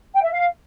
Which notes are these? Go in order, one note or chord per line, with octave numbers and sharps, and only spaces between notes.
G5
E5
F5